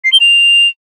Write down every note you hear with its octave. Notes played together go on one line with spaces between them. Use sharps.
C7
G7
F7